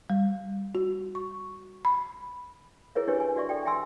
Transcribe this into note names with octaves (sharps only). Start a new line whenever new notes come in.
G3
F#4
C#6
B5
E4 G#4 A#4 C#5 E5
D4 E4 G4 B4 C#5
G#5
F#4 D5 E5 C#6
A4 D5 G5
E5 G5 G#5 C6 E6